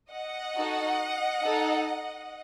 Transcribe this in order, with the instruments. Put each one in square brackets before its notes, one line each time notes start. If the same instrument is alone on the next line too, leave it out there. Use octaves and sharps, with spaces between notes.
[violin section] D#5 F#5
D#4 F#4 A4
D#4 A4